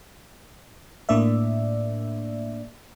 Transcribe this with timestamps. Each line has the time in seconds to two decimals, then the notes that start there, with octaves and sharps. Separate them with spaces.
1.09 A2 A#3 D4 D5 E5